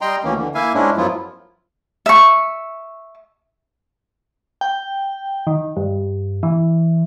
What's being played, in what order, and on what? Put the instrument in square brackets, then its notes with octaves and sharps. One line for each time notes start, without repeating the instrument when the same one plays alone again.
[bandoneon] G3 D#5 G5 A#5 C6
D2 D#3 E3 A#3 C#4
D3 E3
A#3 E4 E5 F5 G#5
G#2 G#3 C#4 D4 E4
F#2 F3 F#3 B3 E4 F4
[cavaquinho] E5 C#6
[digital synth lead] G5
D#3
G2
E3